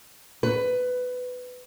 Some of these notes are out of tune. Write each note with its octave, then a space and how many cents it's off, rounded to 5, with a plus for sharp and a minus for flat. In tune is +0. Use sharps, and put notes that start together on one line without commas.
B4 +15